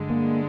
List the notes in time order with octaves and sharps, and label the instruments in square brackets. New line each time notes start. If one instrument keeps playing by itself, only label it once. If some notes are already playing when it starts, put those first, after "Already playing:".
Already playing: [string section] G2 D3 G#3
[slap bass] A#3